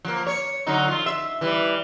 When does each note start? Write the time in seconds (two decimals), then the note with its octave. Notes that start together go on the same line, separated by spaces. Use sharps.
0.05 F3 A#3
0.27 C#5
0.67 D3 F#3 D#4
0.88 F3 F4
1.06 E5
1.41 E3 G3